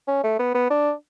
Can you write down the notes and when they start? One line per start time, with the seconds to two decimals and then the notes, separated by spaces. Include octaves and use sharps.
0.08 C#4
0.23 A3
0.39 B3
0.54 B3
0.70 D4